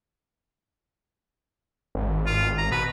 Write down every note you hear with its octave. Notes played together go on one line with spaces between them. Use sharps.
G#1
F4
A#5
B2 B4